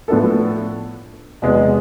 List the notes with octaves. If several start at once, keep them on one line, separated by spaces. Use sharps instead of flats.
A2 F3 B3 D4 A4
E2 C3 G#3 B3